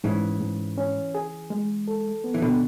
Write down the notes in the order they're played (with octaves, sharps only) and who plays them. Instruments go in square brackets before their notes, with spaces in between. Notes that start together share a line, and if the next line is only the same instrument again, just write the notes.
[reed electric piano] G#2 [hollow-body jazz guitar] C#3 E3
[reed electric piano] G#2
C#4
G#4
G#3
A4
B3
[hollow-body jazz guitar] E3
B2 D3